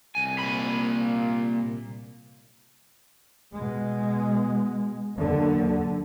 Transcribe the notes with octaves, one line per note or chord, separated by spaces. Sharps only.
C2 G#5
A#2 B5
B2 G#3
D#2 D3 F#3